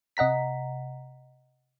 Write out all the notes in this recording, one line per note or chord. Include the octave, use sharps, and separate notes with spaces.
C3 D#5 F#5 A#5 B6